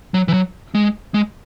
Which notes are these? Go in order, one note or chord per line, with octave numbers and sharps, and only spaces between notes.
F#3
E3
F#3
G#3
G#3